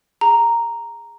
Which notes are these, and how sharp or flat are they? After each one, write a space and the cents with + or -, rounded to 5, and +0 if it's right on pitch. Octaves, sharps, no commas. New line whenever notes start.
G#4 -15 A#5 +0